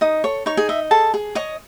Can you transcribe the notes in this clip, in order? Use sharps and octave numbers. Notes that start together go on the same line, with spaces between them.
D#4 D#5 D#6
A4 C#5 C#6
D#4 C#5 C#6
G#4 G#5
D#5 E5
G#4 A4 A5
G#4
C#5 D#5 D#6